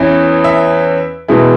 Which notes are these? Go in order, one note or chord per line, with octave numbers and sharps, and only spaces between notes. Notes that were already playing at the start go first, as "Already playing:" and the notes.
Already playing: E2 E3 C#4 E4
E5
E2 B2 G#3 E4